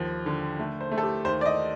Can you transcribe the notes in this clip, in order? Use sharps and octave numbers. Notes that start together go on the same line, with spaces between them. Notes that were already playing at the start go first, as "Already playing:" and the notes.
Already playing: D#2 F3
D3
A3
C5
A3
A4
G4
D#2 C5
D5
D#5